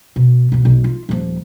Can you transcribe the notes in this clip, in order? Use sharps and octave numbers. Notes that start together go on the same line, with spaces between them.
B2
B1 B2
B1
F4
D#1 F3